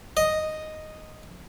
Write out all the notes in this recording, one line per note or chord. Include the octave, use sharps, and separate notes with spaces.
D#5